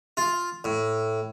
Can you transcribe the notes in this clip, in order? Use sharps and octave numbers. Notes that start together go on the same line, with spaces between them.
F4
A2